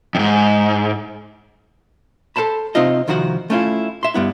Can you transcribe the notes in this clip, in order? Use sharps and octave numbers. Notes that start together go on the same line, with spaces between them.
F2 G#2
A4 A#4 C5 A5 B5
C3 C4 D#4 F4 D#5
C2 D#3 F3 F#4 F#5
A3 C#4 E4 F4
E5 C6
G2 G3 B3 E4